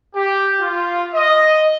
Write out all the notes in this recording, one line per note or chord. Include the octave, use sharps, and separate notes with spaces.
G4
F4
D#5